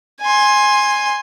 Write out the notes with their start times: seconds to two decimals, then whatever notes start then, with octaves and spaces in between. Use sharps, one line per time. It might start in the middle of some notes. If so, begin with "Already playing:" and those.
0.21 G#5 C6